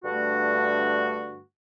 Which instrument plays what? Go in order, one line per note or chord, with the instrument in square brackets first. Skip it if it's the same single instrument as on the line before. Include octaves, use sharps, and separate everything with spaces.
[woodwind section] G2 D3 A3 F#4